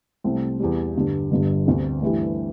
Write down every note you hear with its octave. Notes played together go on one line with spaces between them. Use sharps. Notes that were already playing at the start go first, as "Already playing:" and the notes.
C2 C3 A3 C4
E2 E3 G3
G2 D3 G3
G1 G2 D3 G3
D2 D3 C4 G4
G2 E3 A3 E4 G4